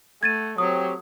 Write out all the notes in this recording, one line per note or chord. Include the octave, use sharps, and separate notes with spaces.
A3 F#5 G#6 A6 D#7
F#3 C4 G4 C#5 D#6